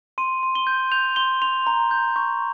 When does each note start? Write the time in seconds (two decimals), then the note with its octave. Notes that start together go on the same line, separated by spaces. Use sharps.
0.18 C6 D#7
0.43 C6
0.55 G7
0.67 G6
0.92 G6 F7
1.16 C6 G7
1.42 C6 F7
1.67 A#5
1.91 G6
2.16 C#6